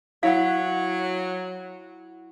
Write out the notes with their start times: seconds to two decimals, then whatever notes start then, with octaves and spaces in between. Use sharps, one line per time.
0.23 F#3 E4 F5 F#5